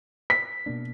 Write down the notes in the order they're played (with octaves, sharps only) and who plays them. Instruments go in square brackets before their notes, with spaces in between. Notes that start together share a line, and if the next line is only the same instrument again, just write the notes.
[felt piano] B6
[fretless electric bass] B2 A#3 D4